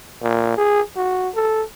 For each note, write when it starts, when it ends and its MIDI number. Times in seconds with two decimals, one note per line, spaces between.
0.22 0.54 46
0.57 0.81 68
0.96 1.29 66
1.35 1.62 69